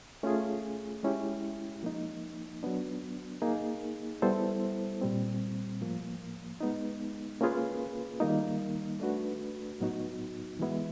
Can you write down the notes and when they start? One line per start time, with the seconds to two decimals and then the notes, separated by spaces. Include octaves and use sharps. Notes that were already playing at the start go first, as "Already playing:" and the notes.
0.23 A3 C#4 F4 G#4
1.03 G#3 C#4 E4 G4
1.83 F3 A#3 D#4
2.63 F#3 B3 D4
3.42 A#3 D#4 G#4
4.22 G3 B3 E4 A4 C5
5.01 A#2 G3 C4
5.81 A2 F3 A#3
6.61 G#3 B3 D#4
7.41 A#3 C#4 F4 G#4 B4
8.20 D#3 G3 A#3 D#4
9.00 A3 D4 F#4 B4
9.80 A2 F#3 B3 D#4 F#4
10.59 E3 G#3 B3 E4